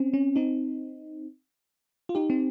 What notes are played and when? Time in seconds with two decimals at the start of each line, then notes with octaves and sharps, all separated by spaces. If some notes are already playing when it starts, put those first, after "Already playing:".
Already playing: C4 C#4
0.14 C#4
0.36 C4 D#4
2.09 F4
2.15 D#4 G4
2.30 C4